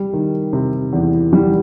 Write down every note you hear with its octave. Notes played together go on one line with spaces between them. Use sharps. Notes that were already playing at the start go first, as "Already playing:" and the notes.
Already playing: G3
D#3
C3
E2
G3